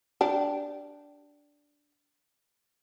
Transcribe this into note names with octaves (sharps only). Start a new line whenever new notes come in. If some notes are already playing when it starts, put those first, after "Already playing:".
D4 G4